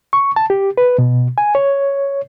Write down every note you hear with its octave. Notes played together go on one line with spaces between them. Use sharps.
C#6
A5
G4
B4
B2
G#5
C#5